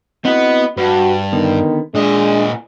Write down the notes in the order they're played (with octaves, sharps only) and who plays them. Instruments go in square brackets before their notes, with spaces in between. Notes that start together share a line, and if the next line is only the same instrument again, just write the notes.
[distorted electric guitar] B3 [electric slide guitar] C4 E4 F#4 [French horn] D#5
[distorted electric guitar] G2 [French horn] F#4 [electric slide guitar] B4
[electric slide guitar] D3 B3 [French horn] D#3
[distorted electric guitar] A#2 D#5 [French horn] G#3 [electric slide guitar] D4